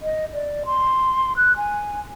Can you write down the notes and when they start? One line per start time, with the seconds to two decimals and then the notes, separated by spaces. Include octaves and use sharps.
0.02 D#5
0.33 D5
0.65 C6
1.37 F#6
1.56 G#5